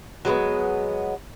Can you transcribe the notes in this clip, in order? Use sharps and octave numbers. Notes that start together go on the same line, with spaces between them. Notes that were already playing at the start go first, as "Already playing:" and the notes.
F#3 G#3 A#3 B3